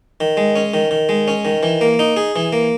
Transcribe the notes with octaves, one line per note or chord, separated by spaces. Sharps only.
D#3
G#3
C#4
D#3
D#3
G#3
C#4
D#3
E3
A#3
D#4
G#4
E3
A#3